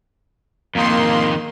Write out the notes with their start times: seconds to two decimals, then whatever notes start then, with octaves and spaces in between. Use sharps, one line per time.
0.75 F2 D#3 A#3 C6